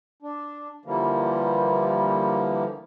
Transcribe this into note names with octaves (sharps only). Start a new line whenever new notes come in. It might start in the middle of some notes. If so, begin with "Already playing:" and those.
D4
D3 E3 F3 G3 A#3